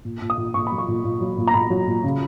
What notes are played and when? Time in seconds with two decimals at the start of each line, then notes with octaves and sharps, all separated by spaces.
0.05 A#2
0.22 A#2
0.30 D#6
0.37 A#2
0.54 A#2 C#6
0.67 F#3 B5
0.78 C#6
0.88 A#2
1.04 A#2
1.21 F#3
1.38 A#2
1.48 A#5
1.54 A#2 B5
1.70 F#3
1.87 A#2
2.04 C#3